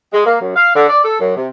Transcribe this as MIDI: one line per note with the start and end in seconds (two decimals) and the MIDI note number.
0.13 0.26 56
0.26 0.38 58
0.41 0.56 42
0.56 0.73 77
0.75 0.88 50
0.89 1.01 74
1.04 1.17 69
1.20 1.35 42
1.36 1.47 48